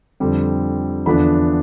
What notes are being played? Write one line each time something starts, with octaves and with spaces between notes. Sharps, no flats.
F2 D3 G3 C4
E2 D3 F3 B3 D4 B5